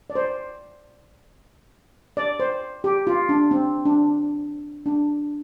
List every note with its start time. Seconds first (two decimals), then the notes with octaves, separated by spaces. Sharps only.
0.10 D5
0.15 C5
2.17 D5
2.40 C5
2.84 G4
3.07 F4
3.29 D4
3.51 C4
3.85 D4
4.86 D4